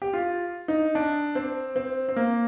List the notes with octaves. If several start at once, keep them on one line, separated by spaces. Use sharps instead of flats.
G4
F4
D#4
D4
C4
C4
C4
A#3